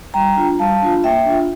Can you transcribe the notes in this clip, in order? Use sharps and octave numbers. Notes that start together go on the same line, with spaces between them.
G3 G5 A#5
D4 F4
G3 F5 A5
D4 F4
A#3 E5 G5
D4 F4